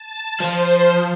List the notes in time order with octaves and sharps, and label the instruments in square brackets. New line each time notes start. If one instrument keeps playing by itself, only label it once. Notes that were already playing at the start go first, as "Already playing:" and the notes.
Already playing: [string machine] A5
[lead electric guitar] F3 [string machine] C5